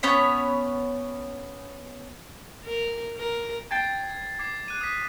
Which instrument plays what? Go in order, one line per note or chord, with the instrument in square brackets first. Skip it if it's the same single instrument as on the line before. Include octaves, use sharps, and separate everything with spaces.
[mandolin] B3 C#4 C#5 B5
[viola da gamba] A#4
A#4
[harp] G5 A5 [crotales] G#6 A6 C7
[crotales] D6 G#6 C7
F#6 D#7
D#6 B6